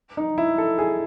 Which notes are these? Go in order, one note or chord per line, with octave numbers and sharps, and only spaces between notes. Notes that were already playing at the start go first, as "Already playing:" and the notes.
D#4
E4
A4
G#4